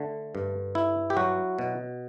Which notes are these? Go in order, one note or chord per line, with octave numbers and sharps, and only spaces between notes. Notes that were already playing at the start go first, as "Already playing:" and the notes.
Already playing: D3 A3
G2
E4
G4
F#3 F#4
B2